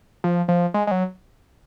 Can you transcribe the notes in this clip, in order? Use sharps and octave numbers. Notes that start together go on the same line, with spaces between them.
F3
F3
G#3
G#3
F#3